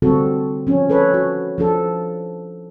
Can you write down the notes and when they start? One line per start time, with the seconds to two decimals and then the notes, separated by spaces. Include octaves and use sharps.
0.02 D3 G3 C4 F#4 A4
0.67 F3 C#4
0.89 A4 B4 C#5
1.14 F#4
1.58 F3 D4 A4